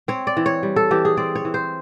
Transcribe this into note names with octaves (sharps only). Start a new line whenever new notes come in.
C4 C#5
D5
E3
C#5
G3
A4
E3 G4
G#4
C4 D5
C#5
E3
C5